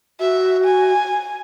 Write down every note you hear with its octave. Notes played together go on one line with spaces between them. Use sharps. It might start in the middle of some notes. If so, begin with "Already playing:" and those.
F#4 E5
G#5